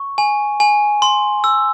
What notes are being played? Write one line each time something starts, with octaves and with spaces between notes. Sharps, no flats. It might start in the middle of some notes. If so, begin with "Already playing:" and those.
Already playing: C#6
G#5
G#5
C6
E6